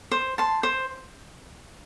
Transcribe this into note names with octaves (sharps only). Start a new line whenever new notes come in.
C5
A5 C6
C5